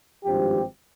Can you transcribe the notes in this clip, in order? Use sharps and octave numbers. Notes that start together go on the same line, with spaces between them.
G#1 G2 F3 C4 G4